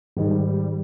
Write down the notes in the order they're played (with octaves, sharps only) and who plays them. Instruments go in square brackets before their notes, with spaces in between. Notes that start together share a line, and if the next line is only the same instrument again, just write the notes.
[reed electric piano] G#2 D#3 [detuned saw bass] G3